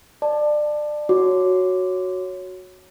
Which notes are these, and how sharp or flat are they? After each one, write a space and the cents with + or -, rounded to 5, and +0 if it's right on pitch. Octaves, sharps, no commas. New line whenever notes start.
D5 +25 A5 +5
F#4 +0 C#5 +0 D6 +0